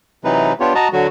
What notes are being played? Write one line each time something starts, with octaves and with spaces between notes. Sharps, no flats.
C3 E3 F#3 D#4 B4
B3 D4 F4 G4 C#5
F#4 D#5 A5 A#5
D3 F#3 F#4